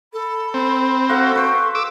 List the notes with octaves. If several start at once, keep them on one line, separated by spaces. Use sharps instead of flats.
A4 B5
C4 B5
F#4 A4 F5
B4 C5 G5 C#6
A4 D6 E6